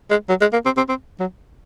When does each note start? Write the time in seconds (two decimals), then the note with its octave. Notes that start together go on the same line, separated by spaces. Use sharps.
0.10 G#3
0.29 F#3
0.41 G#3
0.53 A#3
0.65 C4
0.77 C4
0.89 C4
1.20 F#3